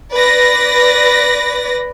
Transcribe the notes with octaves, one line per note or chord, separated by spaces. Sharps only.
B4 D5 A#6